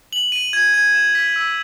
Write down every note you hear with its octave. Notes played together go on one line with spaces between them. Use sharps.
F#7
D#7
G#6
G#6
E7
B6
E6